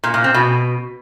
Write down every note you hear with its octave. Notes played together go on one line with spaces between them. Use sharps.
A#2
A#2
C4
B2